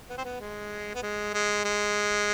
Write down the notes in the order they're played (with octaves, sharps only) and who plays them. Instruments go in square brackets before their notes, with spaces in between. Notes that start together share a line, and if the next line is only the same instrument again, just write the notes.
[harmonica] B3
C4
B3
G#3
B3
G#3
G#3
G#3